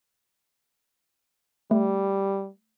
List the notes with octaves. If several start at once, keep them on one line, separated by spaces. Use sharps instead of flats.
G3 A3